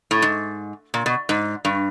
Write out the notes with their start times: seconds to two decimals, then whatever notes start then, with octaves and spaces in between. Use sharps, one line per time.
0.11 A2
0.22 G#2
0.94 A#2
1.06 B2
1.29 G#2
1.65 G2